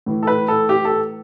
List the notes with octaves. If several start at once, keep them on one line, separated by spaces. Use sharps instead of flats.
A2 E3
A4
B4
A4
G4
A4